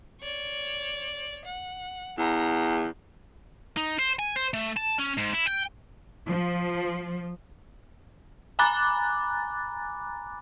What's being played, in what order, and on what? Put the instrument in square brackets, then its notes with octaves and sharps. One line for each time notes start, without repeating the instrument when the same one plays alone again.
[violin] C#5 D5
F#5
[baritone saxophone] E2 [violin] A#5
[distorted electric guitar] D#4
C5
G#5
C5
A3
A5
C#4
G#2
E4
G5
[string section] F3
[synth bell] G#5 A#5 B5 D6 F#6 A6